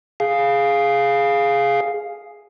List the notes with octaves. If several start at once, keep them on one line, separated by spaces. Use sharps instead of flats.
G#4 F5